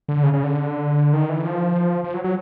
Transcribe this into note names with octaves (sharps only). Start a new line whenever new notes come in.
D3
C#3
C#3
D3
D#3
E3
F3
F3
F#3
F#3